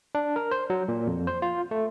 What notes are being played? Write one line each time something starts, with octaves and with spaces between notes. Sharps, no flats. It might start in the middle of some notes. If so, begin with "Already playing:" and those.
D4
A#4
C5
F#3
A#2
F2
C5
F4
A3